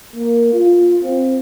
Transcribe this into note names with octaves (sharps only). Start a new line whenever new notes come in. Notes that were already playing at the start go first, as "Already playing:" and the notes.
A#3
F4
C4